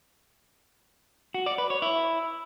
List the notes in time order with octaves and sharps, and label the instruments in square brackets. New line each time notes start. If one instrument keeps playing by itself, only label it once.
[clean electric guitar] F#4
D5
B4
C#5
E4